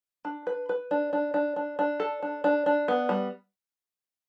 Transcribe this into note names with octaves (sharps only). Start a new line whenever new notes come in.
D4
B4
B4
D4
D4
D4
D4
D4
A4
D4
D4
D4
B3
G3